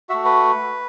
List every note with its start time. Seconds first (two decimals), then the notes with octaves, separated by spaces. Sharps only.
0.09 A3 F#4 E5
0.25 B4